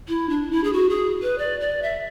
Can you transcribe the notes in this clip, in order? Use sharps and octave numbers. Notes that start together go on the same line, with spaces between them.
E4
D4
E4
G#4
F#4
G#4
B4
D5
D5
E5